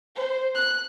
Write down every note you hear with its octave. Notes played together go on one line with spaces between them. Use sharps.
C5
F#6